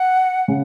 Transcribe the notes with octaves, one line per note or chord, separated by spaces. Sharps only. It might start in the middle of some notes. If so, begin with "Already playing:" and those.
Already playing: F#5
C#3